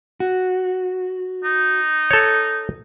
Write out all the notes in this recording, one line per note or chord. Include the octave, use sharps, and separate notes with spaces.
F#4
D#4
A4 C#5